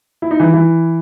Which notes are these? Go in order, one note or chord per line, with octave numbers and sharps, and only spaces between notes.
E4
D#4
E3 E4
E3 E4